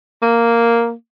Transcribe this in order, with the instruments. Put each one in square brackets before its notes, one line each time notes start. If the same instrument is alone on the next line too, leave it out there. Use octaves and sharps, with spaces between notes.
[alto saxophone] A#3